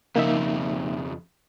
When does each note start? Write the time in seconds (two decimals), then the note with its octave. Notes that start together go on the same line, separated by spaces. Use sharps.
0.16 F2 C#3 A#3 D#4 E5